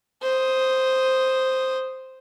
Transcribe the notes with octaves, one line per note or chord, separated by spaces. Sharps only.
C5 D#6